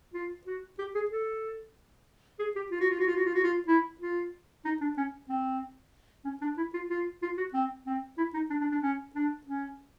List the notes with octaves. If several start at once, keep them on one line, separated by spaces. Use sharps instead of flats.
F4
F#4
G4
G#4
A4
G#4
G4
F4
F#4
F4
F#4
F4
F#4
F4
F#4
F4
E4
F4
D#4
D4
C#4
C4
C#4
D4
E4
F4
F4
F4
F#4
C4
C4
E4
D#4
D4
D4
D4
C#4
D4
C#4